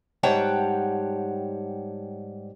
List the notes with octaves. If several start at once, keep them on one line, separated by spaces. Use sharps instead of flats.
G#2 G3 C#5 F#5 G5 A5